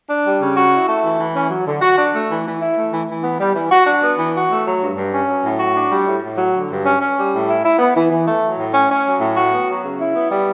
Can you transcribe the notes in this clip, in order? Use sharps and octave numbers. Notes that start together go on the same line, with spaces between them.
D4
G3
C#3
F#4
E4
A3
E3
E3
C#4
F#3
D3
F#4
D4
A3
E3
E3
E4
A3
E3
E3
B3
G3
E3
F#4
D4
B3
E3
F#4
A3
F#3
G2
G2
C#4
F#3
A2
F#4
D4
G3
A2
A2
F#3
D3
G2
C#4
C#4
G3
A2
E4
E4
B3
E3
E3
A3
F#3
A2
C#4
C#4
F#3
A2
F#4
B3
F#3
C#3
E4
B3
G3